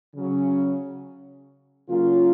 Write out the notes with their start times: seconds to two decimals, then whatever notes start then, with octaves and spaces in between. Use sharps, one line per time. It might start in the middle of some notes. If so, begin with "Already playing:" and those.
0.15 C#3 F#3 C#4
1.89 C#3 F#3 A#3 F4